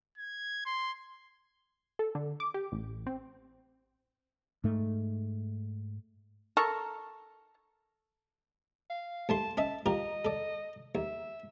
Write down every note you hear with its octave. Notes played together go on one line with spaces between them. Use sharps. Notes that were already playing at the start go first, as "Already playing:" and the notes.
G#6
C6
A4
D3
D6
G4
A1
C4
G#2 A3
A4 A#4 C#6
F5
D#2 A3 A5 C6
C#4 D#5 E5 A5
F4 G4 A#4 D#5
A4 D5
D#2 E5